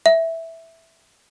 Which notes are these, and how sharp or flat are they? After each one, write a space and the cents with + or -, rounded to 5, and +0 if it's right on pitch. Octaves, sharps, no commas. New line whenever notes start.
E5 -5